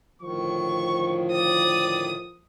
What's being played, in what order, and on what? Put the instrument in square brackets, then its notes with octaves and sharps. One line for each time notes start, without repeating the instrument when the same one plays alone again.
[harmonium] D2 A2 D#3 [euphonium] F3 [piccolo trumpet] C#6
[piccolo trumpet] D5 [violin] D#6